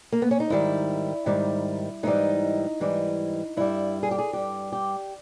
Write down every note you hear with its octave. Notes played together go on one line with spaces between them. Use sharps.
A#3
B3
C#4
D#4
G#2 D#3 G3 E4
G#2 D#3 G3
G#2 E3 G3 D#4
G#2 E3 G3
G2 G3 E4
G#4
G4
G#4
G2 G3 G4
G4